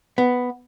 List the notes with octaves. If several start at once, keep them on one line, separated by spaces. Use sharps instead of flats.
B3